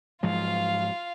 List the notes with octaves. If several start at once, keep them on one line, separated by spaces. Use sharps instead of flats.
G#2 F3 F#3 F4 F5